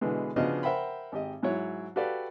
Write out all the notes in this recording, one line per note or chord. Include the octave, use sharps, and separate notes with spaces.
B2 D3 E3 G#3
C#3 F3 B3 D4 F#4 D#5
A#4 C5 E5 F#5 G5 B5
G#1 G4 D#5
G#2 F#3 E4 C#5
F#4 G4 A4 B4 D5 F5